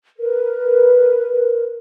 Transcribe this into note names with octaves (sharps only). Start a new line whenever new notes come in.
A#4 B4